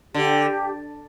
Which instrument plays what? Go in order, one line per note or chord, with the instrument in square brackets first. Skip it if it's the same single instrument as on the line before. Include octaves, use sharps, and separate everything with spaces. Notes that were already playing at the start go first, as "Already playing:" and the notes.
[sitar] D3 [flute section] G4